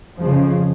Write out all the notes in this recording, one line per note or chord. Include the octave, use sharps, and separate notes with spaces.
F2 C#3 F3